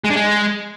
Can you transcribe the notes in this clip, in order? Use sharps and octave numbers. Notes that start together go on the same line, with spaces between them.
G#3
D4
G#3